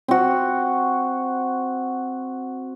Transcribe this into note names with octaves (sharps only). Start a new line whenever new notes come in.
C4 F#4